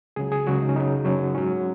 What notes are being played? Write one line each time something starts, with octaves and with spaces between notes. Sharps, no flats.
C#2 C#3 F#3 G#4
G#4
C#2 C#3 F#3 F#4
D#4
C#4
F#2 C#3 F#3 D#4
F#2 C#3 F#3
G#2 F#3 C#4